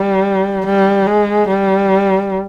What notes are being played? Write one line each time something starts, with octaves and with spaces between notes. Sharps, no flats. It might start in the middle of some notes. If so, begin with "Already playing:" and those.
Already playing: G3
G3
G#3
G3